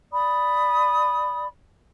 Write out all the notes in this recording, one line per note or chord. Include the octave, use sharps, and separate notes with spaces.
D5 B5 D#6